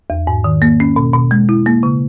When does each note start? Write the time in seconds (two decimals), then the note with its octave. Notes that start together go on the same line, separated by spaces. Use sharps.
0.10 E2
0.27 G#2
0.44 D#3
0.62 A#3
0.80 C#4
0.96 B2
1.14 B2
1.31 G#3
1.49 E4
1.66 A#3
1.83 C#3